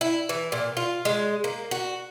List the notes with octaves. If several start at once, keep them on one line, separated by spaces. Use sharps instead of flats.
E4
E3
A#2
F4
G#3
A#3
F#4